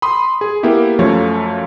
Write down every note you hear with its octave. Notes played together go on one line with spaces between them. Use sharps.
B5 C6 D#6
G#4
A#3 B3 E4 G4
F#2 F3 A3 C#5